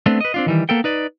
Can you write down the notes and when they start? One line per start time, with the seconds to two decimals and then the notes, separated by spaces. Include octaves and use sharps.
0.06 A3 B3 C4 D4
0.21 B4 D#5
0.34 C4 D4 F4
0.46 D#3 E3 G3
0.69 A#3 B3 A4 G5
0.84 D#4 B4 D5